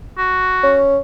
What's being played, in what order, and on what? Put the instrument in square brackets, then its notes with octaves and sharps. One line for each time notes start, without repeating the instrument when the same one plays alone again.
[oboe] F#4
[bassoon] C#4